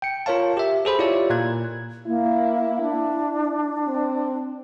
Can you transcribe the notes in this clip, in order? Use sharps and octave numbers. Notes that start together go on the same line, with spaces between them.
G5 C#7
F4 A#4 C#5 F5 A5
G4 E5
G#4 A4 C5 B5
E4 F4 G4 C#5 D5
A#2 A#3 F#6 G#6
A#3 E4
D4
C4